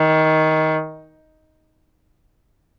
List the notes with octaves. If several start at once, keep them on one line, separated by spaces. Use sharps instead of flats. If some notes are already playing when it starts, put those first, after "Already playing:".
Already playing: D#3